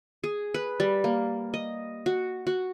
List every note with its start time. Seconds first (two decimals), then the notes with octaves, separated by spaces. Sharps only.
0.24 G#4
0.54 B4
0.80 G3
1.04 A#3
1.54 D#5
2.06 F#4
2.47 F#4